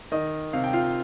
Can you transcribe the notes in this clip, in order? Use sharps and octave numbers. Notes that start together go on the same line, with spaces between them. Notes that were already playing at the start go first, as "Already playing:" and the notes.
D#3 D#5
C3 F5
G5
F4 F5